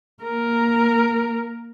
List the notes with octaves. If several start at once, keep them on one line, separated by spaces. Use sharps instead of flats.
A#3 A#4